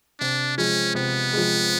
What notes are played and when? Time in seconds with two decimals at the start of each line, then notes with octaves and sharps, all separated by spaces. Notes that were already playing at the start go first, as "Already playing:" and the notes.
0.20 C3 D4
0.58 F3 G#3 C#4
0.95 C3 B3
1.33 F3 G#3